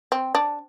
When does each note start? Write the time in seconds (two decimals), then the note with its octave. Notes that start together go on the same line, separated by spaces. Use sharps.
0.12 C4
0.35 D4